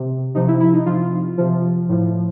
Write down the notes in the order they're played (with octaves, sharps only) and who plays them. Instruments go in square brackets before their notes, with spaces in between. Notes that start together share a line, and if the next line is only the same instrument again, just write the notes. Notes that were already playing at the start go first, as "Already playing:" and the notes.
Already playing: [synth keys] C3
C3 F3 D#4
E4
E4
D#4
C3 F3 F4
C3 F3
A2 F3